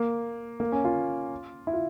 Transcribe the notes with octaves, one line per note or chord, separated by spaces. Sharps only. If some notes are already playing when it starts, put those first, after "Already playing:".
Already playing: A#3
A#3
C#4
F4
E4
F4